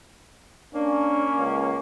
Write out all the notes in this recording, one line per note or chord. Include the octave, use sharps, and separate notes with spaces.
A#3 C#4 D4
C#2